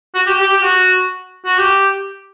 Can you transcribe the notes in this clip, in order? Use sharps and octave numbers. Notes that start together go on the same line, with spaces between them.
F#4
G4
G4
G4
F#4
F#4
G4